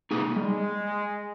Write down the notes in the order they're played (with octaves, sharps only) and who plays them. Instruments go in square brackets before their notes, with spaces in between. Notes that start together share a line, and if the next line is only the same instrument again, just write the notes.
[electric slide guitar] A#3 D#4 G#4
[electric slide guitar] G3 [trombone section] G#3